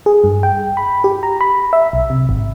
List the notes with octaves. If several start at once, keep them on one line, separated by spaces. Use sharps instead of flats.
G#4
G2
G5
B5
G4
A#5
B5
E5
B1
C3
G#1